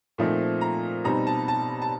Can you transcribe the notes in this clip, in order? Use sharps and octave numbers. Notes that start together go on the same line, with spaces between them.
A#2 F3 A3 C4 D#4
A#5
B2 G3 C4 D#4 A#5
A5
A5
A5